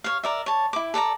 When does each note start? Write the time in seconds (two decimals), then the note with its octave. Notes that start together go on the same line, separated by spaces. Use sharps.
0.04 C#5 F5
0.23 A#4 D5 E5
0.46 C#5 A5
0.73 E4 D6
0.94 A4 D5 F5 A#5